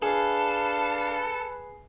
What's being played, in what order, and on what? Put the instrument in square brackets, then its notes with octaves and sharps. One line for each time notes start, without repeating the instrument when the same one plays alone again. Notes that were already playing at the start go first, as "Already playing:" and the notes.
[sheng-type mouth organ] D4 F5 A5 [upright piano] G#4 [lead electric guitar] A4 [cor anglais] B4